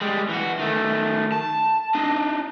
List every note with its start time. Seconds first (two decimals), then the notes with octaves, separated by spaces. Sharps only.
0.01 G3 G#3
0.29 E3 F#4
0.59 D#3 A3
1.32 A5
1.95 D4 D#4